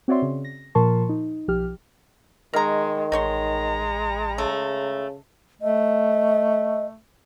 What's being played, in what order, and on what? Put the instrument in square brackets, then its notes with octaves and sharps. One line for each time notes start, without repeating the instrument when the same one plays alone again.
[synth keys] C4 F#4 C#5 D5 E5 C6
C#3
A#6
A#2 F3 A#4 A5 C6 C#6
D#4
B1 F3 G4 F6
[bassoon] D#3 [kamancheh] G#3 [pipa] A#4 A#5
[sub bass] A1 [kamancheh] G#3 A#5 [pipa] D#4 C#5 C6
[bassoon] C#3 [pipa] A3
[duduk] A3 [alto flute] D#5